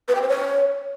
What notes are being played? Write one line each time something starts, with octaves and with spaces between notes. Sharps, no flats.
B4
G5
C5
C#5